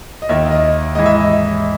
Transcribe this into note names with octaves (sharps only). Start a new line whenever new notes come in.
D#5
D#2 D#3 E5
D#5
G#2 E3 D#5
E5
D#5